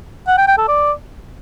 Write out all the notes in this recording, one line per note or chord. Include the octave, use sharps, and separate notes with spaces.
F#5
G5
G5
A4
D5